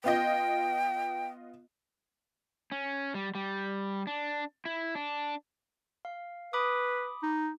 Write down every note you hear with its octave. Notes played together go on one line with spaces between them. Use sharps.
B3 F4 D#5 G5
C#4
G3
G3
D4
E4
D4
F5
B4 B5 D6 D#6
D#4